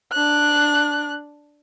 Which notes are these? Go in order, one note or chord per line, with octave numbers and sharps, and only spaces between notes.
D4 F#6